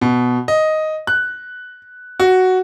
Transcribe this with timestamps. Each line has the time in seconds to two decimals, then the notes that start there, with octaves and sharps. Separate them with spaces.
0.01 B2
0.48 D#5
1.07 F#6
2.20 F#4